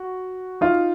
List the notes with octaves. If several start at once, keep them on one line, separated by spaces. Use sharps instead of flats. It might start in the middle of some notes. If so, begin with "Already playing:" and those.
Already playing: F#4
D#4 F4